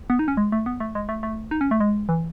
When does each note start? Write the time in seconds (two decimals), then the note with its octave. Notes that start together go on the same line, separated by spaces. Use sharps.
0.10 B3
0.19 D#4
0.28 C#4
0.37 G#3
0.52 A3
0.66 B3
0.80 A3
0.95 G#3
1.09 A3
1.23 A3
1.51 D#4
1.61 C#4
1.71 A3
1.80 G#3
2.09 E3